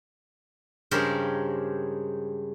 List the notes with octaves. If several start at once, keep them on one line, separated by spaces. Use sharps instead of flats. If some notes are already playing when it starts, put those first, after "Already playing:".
G2 C#3 G#3 G4 A#4 C5